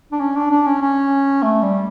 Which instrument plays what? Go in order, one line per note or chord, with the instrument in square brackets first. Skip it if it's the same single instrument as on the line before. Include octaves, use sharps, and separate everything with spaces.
[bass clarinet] D4
C#4
D4
D4
C#4
C#4
A3
G3